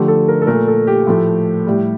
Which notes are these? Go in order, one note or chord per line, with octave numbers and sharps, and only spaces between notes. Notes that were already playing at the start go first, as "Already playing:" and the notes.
Already playing: D3 F3 A3 G4
A4
A#4
A4
A#2 A3 A#4
A4
G4
A2 F3 A3
A2 G3